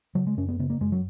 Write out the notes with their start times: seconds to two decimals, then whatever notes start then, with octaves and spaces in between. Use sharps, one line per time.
0.15 C#3 F#3
0.27 G#3
0.37 F#2 C#4
0.49 B3
0.59 C#3 B3
0.70 A#3
0.81 F#2 G#3
0.92 F#3